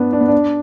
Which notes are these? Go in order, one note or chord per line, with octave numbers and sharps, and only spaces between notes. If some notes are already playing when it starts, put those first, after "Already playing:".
Already playing: B3 D4
D4
B3
D4